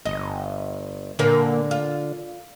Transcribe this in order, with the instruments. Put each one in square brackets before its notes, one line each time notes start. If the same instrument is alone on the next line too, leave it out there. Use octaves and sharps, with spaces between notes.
[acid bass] G1 [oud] D#5
[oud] A#2 A#3 A#4 [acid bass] D3
[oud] F4